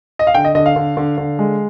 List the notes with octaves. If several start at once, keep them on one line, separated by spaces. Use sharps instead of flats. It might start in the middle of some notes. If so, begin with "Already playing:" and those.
D#5
F5
D3 G5
D#5
D3 D#5
F5
D3
D3
D3
G#3